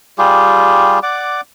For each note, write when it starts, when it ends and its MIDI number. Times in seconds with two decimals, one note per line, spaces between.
0.18 0.99 55
0.18 0.99 65
0.18 0.99 67
0.18 0.99 68
1.03 1.41 74
1.03 1.41 78
1.03 1.41 86